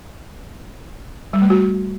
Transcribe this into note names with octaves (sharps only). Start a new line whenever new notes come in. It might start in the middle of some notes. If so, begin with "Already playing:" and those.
G3
A3
F#4